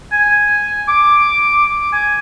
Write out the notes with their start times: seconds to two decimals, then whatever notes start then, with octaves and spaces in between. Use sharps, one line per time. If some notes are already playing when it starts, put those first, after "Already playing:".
0.12 G#5
0.88 D6
1.93 G#5